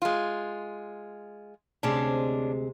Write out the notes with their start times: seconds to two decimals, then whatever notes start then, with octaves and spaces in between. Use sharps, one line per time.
0.02 G#3 F4
1.83 D2 C3 G#3 C#4 D4